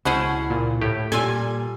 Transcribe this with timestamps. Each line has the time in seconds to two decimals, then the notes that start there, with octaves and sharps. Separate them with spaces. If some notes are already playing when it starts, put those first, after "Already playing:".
0.05 C#2 B2 C#4 E4 G#4 C5 F#5
0.50 A#2
0.82 A2 G4
1.12 A#2 G3 F4 A4 G#5